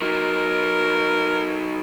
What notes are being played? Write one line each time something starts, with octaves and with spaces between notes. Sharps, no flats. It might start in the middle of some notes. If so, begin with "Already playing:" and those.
F#3 D#4 A#4